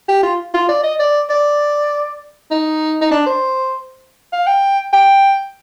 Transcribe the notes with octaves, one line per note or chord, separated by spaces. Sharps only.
G4
F4
F4
D5
D#5
D5
D5
D#4
D#4
D4
C5
F5
G5
G5